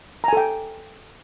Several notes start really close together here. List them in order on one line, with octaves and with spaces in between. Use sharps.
A#5 G#5 A4 G5